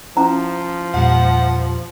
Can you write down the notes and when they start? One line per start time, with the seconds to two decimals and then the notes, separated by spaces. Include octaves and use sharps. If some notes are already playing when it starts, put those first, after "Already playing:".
0.17 F3 C#4 E4 A#5
0.94 E2 A#2 G3 F#5